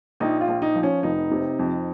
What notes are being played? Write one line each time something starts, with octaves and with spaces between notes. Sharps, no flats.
A#1 D#4
F4
A#1
D#4
F3
C#4
F1 D#4
C3
F2